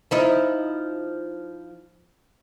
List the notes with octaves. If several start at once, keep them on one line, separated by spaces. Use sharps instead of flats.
F3 D#4 E4